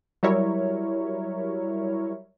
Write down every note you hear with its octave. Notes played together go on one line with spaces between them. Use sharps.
F#3 G3 E4 A#4 C#5 E5